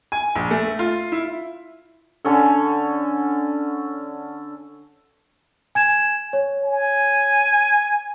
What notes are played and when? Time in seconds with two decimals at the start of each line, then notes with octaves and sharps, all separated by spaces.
0.12 G#5
0.36 A#1
0.51 A3
0.79 F4
1.12 E4
2.25 D3 C#4 A4
5.75 G#5 G#6 E7
6.33 C#5
6.65 G#5